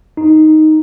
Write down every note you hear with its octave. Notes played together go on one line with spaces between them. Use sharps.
D#4